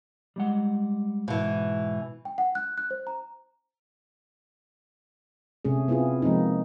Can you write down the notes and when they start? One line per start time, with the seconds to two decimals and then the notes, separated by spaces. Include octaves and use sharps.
0.36 G3 G#3 F#5
1.28 G#2 B2 E3
2.25 G5
2.38 F#5
2.55 F#6
2.78 F#6
2.91 C5
3.07 A#5
5.65 C3 A3 C#4 G#4
5.88 B3 C4 E4 F4 G#4
6.22 F3 G#3 A#3 C4 D#4